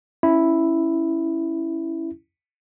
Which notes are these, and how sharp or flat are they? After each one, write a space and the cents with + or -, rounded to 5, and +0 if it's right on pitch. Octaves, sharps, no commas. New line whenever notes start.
C#4 +0 E4 +0